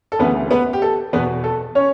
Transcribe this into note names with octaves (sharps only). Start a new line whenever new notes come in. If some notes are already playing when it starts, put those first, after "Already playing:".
A4
D2 C#3 E3 B3 B4
B3 B4
G4
A4
E2 B2 B3 B4
A4
C#4 C#5